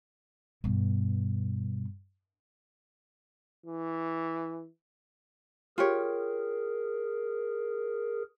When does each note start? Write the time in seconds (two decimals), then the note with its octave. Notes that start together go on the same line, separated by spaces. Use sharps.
0.64 G2 B2
3.66 E3
5.78 F4 G4 G#4 A#4 C#5